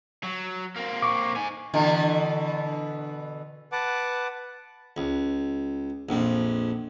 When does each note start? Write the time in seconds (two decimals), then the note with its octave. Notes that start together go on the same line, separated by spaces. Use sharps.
0.24 F#3
0.77 A#3 C4
1.02 C#6 D6
1.37 D#4 G#5
1.74 B2 D3 E3
3.72 B4 F#5 A5 D6
4.97 C#2
6.09 A#1 F2